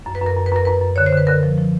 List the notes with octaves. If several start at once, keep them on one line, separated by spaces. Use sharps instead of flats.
F#2
B4
F#2 A#4
F#2
B4
F#2 A#4
F#2 B4
F#2
D3 C#5
C5
D3 B4
D3 A#4
F3
F3